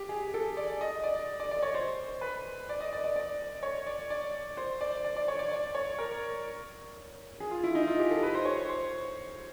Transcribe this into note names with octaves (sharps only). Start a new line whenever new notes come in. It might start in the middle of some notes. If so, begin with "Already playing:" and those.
Already playing: G4
G#4
A4
D5
D#5
D5
D5
D5
C#5
C5
B4
D5
D#5
D5
D5
D5
C#5
D5
D5
C5
D5
D5
D5
C#5
D5
D5
C#5
A#4
G#4
F4
E4
D#4
F4
G4
A4
B4
C5
C#5
C5